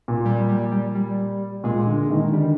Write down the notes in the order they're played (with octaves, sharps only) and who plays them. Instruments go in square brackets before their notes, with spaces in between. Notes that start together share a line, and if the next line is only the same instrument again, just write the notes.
[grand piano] A#2
[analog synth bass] G3
G3
G3
G3
[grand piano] A#2 [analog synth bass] G#3
[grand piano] D3
D#3
[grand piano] D3 [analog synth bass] G3